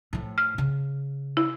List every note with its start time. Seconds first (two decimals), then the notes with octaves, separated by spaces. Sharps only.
0.13 A2 F3
0.38 F6
0.58 C#3
1.37 E4